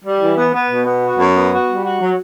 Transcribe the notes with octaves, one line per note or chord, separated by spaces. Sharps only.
G3
E3
B3
B3
B2
B3
F#4
F#2
B3
F#4
G3
F#4
F#3